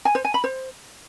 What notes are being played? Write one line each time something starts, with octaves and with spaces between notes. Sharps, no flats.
G#5
C5
G#5
B5
C5